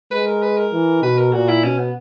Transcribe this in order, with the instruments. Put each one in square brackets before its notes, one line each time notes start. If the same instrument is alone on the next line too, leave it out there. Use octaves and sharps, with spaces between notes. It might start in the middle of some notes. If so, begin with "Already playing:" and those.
[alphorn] G#3 [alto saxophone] B4
[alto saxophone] A#4
B4
A#4
[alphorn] E3
[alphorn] B2 [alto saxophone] B4
[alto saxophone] A#4
[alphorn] A#2 [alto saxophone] F#4
[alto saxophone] E4
[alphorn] B2 [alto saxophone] C#4
[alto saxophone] B3